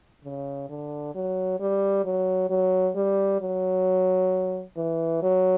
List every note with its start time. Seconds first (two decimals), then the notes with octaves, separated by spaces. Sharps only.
0.24 C#3
0.69 D3
1.15 F#3
1.60 G3
2.05 F#3
2.50 F#3
2.96 G3
3.41 F#3
4.77 E3
5.22 F#3